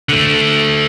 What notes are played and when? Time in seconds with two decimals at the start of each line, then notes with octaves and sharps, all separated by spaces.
0.09 D3 A3